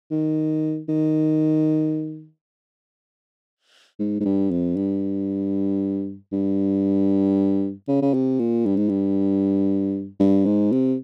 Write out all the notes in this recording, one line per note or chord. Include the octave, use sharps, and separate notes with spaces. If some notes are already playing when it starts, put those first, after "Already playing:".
D#3
D#3
G#2
G#2
G2
F2
G2
G2
C#3
C#3
C3
A#2
G2
G#2
G2
G2
G#2
C3